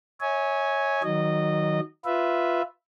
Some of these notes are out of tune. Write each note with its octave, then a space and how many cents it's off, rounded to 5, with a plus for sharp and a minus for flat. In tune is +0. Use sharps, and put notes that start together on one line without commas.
C#5 +0 E5 -35 G#5 +0
D#3 +10 F#3 +5 D#5 -20
F4 +0 B4 +0 E5 +0